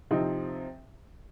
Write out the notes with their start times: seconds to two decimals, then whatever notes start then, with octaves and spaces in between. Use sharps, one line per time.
0.11 C3 F3 C4 D#4